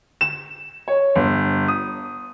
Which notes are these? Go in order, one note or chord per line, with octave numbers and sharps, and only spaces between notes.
E7
C#5
G1
D#6